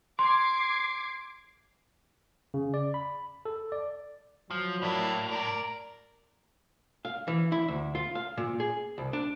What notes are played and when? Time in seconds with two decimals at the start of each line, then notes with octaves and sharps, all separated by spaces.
0.19 C6 D6 G#6 C7
2.54 C#3
2.74 D5
2.94 B5
3.45 A4
3.72 D5
4.51 F3 F#3
4.82 A2 A#3 D4 E4
5.31 A#4 D5
7.05 F5
7.28 E3
7.52 E4
7.68 D2
7.95 F4
8.15 F5
8.37 A#2
8.60 G#4
8.98 C2
9.13 D4